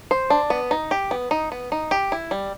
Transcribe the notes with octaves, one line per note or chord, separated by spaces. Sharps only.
C5
D4
B3
D#4
G4
B3
D#4
B3
D#4
G4
E4
G3